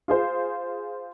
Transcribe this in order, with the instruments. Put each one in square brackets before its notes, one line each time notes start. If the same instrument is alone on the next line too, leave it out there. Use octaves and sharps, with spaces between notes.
[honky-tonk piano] F4 G#4 C5